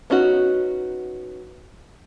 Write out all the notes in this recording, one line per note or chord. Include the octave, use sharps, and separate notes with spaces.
B3 C#4 D#4 F#4